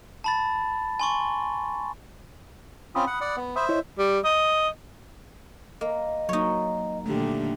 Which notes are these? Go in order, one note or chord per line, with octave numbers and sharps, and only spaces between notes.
A5 B5 A6
G#5 C6 C#6
C4 C#4 F4 B5 D#6
F#5
D5 F#5
B3
C5 E5 B5 D#6
E4 C#5 D#5
G3
D#5
A#3 D#5
F#3 A#3 D#4 C#5
A#2 D3 D#3 A3 G4